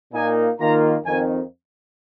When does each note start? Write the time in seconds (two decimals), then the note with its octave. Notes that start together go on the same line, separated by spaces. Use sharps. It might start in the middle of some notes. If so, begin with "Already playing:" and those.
0.13 A#2 A#3 D#4 G#5
0.59 D#3 A#3 F4 A#5
1.05 F2 D#3 C4 G#5